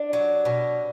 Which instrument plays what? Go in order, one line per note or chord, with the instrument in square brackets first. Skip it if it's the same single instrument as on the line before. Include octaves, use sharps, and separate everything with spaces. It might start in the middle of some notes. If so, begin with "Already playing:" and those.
Already playing: [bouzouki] D4
F#3
B2